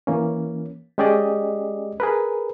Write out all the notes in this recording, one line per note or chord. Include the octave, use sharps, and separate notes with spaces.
E3 A#3 C#4
G#3 C#4 G4 G#4 D5 D#5
G#4 A#4 B4